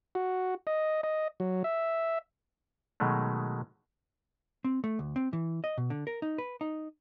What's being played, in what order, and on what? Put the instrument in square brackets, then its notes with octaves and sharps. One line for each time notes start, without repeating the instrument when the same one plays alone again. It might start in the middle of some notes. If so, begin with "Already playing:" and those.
[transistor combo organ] F#4
D#5
D#5
F#3
E5
[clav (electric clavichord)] B2 D#3 F#3 G#3 A3
[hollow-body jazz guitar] C4
A3
D2
C4
E3
D#5
B2
D3
A#4
D#4
B4
D#4